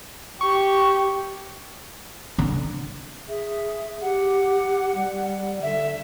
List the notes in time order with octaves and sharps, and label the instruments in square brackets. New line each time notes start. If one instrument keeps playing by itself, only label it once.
[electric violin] G4 [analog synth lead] C#6
[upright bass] D3
[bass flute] G#4 [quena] E5
[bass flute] G4 [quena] F#5
[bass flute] G3
[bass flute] D3 [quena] E5